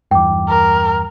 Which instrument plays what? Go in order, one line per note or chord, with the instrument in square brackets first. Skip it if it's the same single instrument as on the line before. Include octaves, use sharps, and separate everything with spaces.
[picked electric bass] E2 G2 [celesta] G5 D6
[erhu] A#4